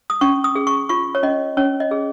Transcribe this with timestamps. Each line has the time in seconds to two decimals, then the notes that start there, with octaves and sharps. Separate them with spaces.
0.10 D#6
0.21 C#4 C#6
0.44 D#6
0.55 G#4
0.67 C#6
0.89 F4 C#6
1.15 C#5
1.23 C#4 D#5
1.57 C#4 C#5
1.80 D#5
1.91 G#4